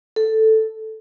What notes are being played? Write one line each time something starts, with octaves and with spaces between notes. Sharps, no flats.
A4